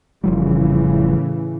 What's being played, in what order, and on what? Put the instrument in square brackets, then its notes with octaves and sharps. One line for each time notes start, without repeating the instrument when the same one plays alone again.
[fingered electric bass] F1 F3 G3 [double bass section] A2 C#3 E3